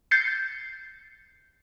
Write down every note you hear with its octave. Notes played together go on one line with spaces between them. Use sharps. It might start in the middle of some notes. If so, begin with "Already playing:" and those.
G6 A6 C7 C#7